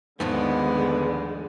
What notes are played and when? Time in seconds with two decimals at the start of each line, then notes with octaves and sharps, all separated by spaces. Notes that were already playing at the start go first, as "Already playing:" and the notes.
0.20 D#2 G#2 D3 F3 G#3 A3 B3